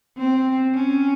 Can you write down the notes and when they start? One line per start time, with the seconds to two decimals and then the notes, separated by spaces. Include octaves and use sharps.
0.17 C4
0.74 C#4